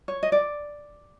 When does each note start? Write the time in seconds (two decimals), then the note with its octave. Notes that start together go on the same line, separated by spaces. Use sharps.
0.08 C#5
0.23 D#5
0.32 D5